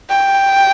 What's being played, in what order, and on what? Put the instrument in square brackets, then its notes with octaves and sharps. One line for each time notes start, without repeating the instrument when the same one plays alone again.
[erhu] G5